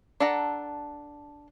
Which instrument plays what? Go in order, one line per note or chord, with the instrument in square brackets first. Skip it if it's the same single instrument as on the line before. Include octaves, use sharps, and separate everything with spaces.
[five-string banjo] D4 A4 F#5 A#5